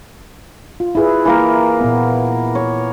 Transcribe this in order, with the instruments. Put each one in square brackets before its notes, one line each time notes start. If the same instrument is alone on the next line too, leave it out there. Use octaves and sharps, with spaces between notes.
[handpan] F4
E4 G#4 B4
[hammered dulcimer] E3 A#3 A#4
[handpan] A#2 B3
[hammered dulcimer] C#5